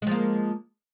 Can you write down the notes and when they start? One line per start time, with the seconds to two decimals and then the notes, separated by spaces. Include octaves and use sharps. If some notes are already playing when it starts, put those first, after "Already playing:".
0.02 G#3
0.07 F3
0.11 A#3